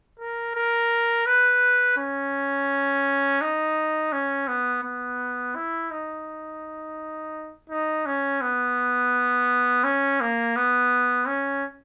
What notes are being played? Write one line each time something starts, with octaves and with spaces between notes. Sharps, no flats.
A#4
A#4
B4
C#4
D#4
C#4
B3
B3
E4
D#4
D#4
C#4
B3
C#4
A#3
B3
C#4